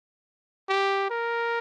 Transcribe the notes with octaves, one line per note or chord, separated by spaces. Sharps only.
G4
A#4